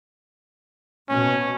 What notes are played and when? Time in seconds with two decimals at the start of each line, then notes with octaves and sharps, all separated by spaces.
1.09 B2 C#4